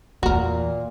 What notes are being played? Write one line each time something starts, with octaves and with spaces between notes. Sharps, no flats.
E2 A#2 E3 F#4 A#4